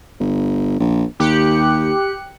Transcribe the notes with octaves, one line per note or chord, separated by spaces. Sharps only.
G1
A#1
D#2 G4 F#6 C#7